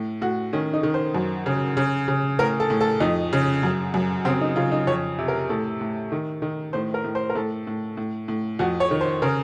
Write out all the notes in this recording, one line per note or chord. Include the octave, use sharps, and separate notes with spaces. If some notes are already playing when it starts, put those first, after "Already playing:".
Already playing: A2
A2 F#4
D#3 C#4
D#4
D#3
C5
F#2
C#3
C#3
C#3
A2 A#4
A4
A2
A4
F2 D#4
C#3
F#2
F#2
C#3 C4
D#4
C#3 F4
D#4
F2 C#5
C3
A#4
A2 A4
A2
D#3
D#3
A2 C5
A#4
A2
C5
A#4
A2 A4
A2
A2
A2
F2 F#4
C#5
D#3
C5
C#3 A#4